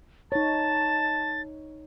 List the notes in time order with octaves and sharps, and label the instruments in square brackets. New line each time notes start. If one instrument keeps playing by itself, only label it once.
[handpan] D#4 C#5 [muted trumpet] A5 [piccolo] A6